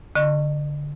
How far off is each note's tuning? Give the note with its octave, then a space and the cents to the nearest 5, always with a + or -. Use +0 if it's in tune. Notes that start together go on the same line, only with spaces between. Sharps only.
D3 -15 D#5 -40 C#6 +0